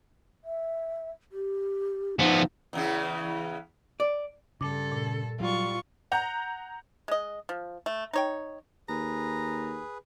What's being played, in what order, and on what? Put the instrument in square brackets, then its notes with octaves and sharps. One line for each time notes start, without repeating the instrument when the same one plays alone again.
[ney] E5
G4
[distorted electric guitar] F3 B3 [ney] D#4
[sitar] E2 C#3 E3
[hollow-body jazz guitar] D5
[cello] G2 A4 [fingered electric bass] C#3 [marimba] D6
[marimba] A#2
[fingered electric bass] F#3 [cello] G3 [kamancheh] F4 C#6
[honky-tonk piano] F#5 A#5 G6
[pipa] G#3 D#5
F3
A3
D#4 C#5 G5
[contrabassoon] D#2 [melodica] G#4 B4 [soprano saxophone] A#5